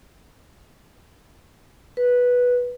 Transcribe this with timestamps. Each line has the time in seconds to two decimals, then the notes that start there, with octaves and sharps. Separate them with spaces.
1.97 B4